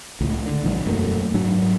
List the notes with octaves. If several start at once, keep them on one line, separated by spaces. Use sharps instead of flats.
C#2 A2
D3
A#1 D#3 E3 G3
E1 F#2 A3 A#3
G#2 F#3 D4